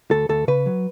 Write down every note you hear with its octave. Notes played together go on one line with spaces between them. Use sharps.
D2 A4
D2 A4
C#3 B4
F#3